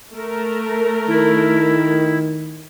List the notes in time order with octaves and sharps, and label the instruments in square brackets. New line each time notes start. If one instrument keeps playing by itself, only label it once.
[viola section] A3 A#4
[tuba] D#3 [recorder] E4